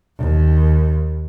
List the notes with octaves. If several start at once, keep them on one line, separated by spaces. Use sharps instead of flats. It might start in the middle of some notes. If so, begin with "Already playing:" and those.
D#2